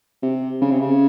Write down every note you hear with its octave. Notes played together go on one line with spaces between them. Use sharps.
C3
C#3
C3
C#3